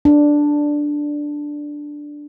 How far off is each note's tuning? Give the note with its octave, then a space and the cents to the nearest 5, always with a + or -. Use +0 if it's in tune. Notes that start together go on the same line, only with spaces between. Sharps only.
D4 +0